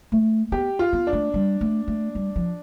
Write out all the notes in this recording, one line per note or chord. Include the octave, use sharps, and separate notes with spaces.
A3
B3 G4
F4
B3
D4
A3
G3
A3
A3
G3
F3